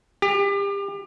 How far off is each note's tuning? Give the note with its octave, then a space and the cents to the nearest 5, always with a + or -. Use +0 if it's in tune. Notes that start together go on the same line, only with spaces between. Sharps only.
G4 +30